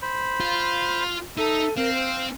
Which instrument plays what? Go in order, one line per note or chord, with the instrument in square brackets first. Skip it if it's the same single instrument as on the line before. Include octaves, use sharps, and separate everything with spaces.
[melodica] C5 B5
[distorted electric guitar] F4
[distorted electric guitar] D#4 [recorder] A4 [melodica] E5
[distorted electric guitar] C4 [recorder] A#4 [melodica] F5
[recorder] C5